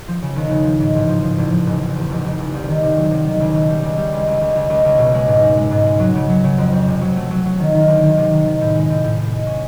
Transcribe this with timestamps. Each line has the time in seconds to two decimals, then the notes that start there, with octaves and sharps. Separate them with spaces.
0.08 F3
0.22 C#3
0.36 D#2
0.51 C#3
0.65 F3
0.80 G#2
0.95 A1
1.08 F3
1.23 F3
1.38 A1
1.52 F3
1.67 F1
1.81 F1
1.96 E2
2.09 F1
2.24 F1
2.38 F1
2.54 C2
2.68 D#3
2.83 C3
2.97 F#3
3.11 C3
3.26 D#3
3.40 C#2
3.55 B2
3.69 G3
3.83 C#2
3.98 G3
4.12 C#2
4.27 C#2
4.41 C#2
4.56 C#2
4.70 C#2
4.85 C#2
4.99 B2
5.14 G#3
5.27 G#2
5.43 G#3
5.56 G#3
5.71 G#2
5.86 G#3
6.00 F#3
6.15 C#3
6.29 F#3
6.44 C#3
6.58 F2
6.72 F2
6.87 C3
7.01 F#3
7.16 A3
7.31 F#3
7.45 F#3
7.59 D#3
7.74 D#3
7.88 D2
8.03 D#3
8.17 C3
8.31 D#3
8.46 D#3
8.61 A2
8.75 G#3
8.90 A2
9.04 A2
9.18 A2
9.32 G#3
9.47 C#4